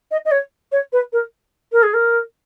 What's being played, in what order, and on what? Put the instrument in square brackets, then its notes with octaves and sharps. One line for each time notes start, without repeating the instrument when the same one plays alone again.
[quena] D#5
D#5
C#5
C#5
B4
A#4
A#4
G#4
A#4